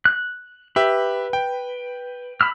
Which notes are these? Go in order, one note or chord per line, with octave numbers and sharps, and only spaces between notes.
F#6
G4 B4 E5
G5
B5 E6 F6